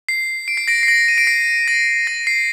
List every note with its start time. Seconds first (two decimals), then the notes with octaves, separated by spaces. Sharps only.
0.09 C7
0.48 D7
0.57 C7
0.68 A#6 D7
0.83 C7
0.87 A#6 D7
1.08 D#7
1.18 D7
1.27 C7
1.68 A#6
2.07 A#6
2.27 C7